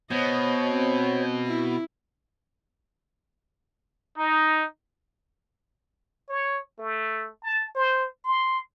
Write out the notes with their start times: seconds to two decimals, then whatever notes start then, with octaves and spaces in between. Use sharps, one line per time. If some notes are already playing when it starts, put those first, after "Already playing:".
0.11 B2 C5 C#5 D#5
0.66 C4
1.47 E4
4.17 D#4
6.29 C#5
6.79 A3
7.43 A5
7.75 C5
8.25 C6